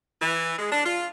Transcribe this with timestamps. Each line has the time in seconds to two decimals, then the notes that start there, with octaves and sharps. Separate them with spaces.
0.22 E3
0.59 G#3
0.71 D4
0.85 F4